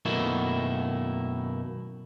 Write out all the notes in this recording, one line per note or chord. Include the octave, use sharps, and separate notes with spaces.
F#2 B2 D#3 A3 A#3 E4